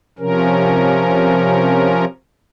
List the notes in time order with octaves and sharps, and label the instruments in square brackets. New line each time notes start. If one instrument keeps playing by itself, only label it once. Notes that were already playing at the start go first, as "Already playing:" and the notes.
[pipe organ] C3 F3 C#4 A#4